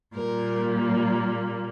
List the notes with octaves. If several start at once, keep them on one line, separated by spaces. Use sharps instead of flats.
A#2 G3 A#3 A#4